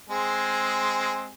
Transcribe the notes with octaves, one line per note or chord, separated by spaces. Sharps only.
G#3 C4 G#4